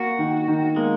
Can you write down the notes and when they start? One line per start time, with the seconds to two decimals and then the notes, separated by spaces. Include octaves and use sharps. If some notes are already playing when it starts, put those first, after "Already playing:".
Already playing: A#3 F#4
0.19 D#3
0.48 D#3
0.76 G#3 A#3